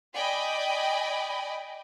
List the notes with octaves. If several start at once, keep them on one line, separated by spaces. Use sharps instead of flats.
D5 D#5 G5 G#5 B5